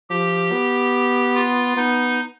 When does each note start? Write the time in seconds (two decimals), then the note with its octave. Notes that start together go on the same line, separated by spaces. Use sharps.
0.10 F3 G4
0.52 B3
1.35 F4
1.77 B3 D#4